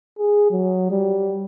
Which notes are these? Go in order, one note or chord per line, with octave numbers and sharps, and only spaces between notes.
G#4
F#3
G3